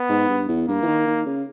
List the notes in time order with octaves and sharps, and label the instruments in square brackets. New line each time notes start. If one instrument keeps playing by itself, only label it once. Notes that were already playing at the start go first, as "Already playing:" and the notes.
Already playing: [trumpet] B3
[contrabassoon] G#2
G2
E2
[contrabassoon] G2 [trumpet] A#3
[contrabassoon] E3
D#3
D#3
C#3